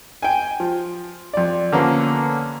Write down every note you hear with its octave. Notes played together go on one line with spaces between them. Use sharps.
G5 G#5
F3
F2 D5
D3 F3 A#3 B3 C#4